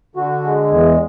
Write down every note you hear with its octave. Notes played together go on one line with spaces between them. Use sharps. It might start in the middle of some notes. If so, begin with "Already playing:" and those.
D3 F#4
G#3
E2